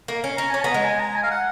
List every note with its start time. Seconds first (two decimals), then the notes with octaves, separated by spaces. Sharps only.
0.08 A#3
0.24 C#4
0.36 C#4 A#5
0.50 C#4 G#5
0.63 B3 A#5
0.74 G#3
0.84 G#5
1.00 A#5
1.15 G#5
1.23 F5
1.31 F#5